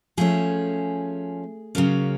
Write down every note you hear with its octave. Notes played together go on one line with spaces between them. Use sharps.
F3 A3 C#4 G#4
C#3 F#3 A#3 C#4